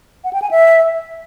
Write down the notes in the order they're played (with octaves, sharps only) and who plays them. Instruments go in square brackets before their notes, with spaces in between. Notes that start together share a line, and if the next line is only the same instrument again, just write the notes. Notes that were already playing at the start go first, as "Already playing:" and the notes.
[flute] F#5
G5
G#5
E5